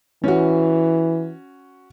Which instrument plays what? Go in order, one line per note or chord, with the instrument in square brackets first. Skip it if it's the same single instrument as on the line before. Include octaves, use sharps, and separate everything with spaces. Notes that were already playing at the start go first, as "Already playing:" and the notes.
[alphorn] E3 [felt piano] C#4 F#4